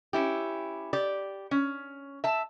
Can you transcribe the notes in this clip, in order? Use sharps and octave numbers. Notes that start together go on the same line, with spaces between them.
C#4 E4 G4
G4 D5
C#4
E5 A5